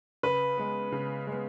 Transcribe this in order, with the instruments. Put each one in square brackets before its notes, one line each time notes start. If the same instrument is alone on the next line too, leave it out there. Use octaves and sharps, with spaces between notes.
[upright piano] C#3 [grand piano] B4
[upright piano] G#3 B3
C#3
G#3 B3